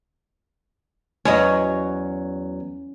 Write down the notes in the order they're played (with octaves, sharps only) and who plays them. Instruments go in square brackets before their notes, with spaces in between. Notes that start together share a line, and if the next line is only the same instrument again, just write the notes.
[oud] E2 F#3 D#5 [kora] C#4